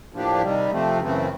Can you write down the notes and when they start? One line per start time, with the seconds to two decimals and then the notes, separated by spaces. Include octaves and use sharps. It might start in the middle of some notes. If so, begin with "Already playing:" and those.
0.13 A2 F3 A#3 D4 G4
0.42 C3 D#3 G3
0.71 C3 F3 A3 C4
1.01 F#2 C#3 E3 A3 C4